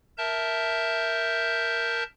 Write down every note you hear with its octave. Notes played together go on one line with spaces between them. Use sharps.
A#4 E5 A5 G6